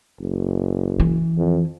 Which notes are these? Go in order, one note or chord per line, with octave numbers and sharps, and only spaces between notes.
F#1
E3
F2